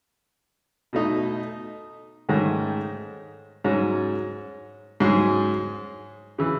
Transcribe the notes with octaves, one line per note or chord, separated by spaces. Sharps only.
B2 A3 D#4
G#2 D#3 A3 C#4
G#2 F#3 C#4
G#2 F#3 C#4 G#4
C#3 E3